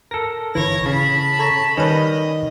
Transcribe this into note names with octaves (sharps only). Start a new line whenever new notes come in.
A4 A#4 A#6
G1 E3 C#5 A#6
C#3 A5 B5
A4 C#5 A#5
D#3 G3 C#4 B4 D#5